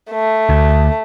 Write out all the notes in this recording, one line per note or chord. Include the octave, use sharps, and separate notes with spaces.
A3
D2